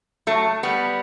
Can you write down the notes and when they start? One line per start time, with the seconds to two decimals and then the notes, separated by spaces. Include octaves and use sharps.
0.27 F#3 A3
0.63 G3 B3